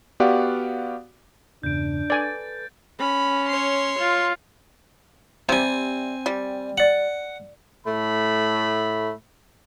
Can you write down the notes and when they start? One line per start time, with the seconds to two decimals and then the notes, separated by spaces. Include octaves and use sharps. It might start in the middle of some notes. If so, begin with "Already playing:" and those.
0.20 B3 F#4 G4 D5 F5 F#5
1.63 E2 G2 C#3 D4 G6 D7
2.10 A4 B4 D5 G#5 A6
2.99 C#4 B5
3.48 C#5 C6
3.99 F4
5.49 C3 G3 C4 G#5
6.26 G3
6.78 D5 F#5 F#7
7.86 A2 A3 B5